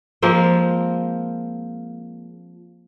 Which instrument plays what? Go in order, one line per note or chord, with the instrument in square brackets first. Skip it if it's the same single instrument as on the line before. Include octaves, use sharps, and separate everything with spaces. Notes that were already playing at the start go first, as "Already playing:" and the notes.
[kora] F3 G#3 A#3 C4